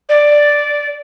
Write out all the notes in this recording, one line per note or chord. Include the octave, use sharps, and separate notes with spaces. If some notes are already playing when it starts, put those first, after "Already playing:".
D5